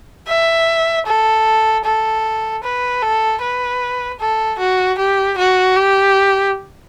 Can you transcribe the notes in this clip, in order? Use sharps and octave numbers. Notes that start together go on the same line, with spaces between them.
E5
A4
A4
B4
A4
B4
A4
F#4
G4
F#4
G4